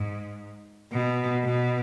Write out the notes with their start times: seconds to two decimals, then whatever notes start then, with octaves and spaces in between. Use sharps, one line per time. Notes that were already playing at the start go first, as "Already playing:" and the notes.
Already playing: G#2
0.92 B2
1.44 B2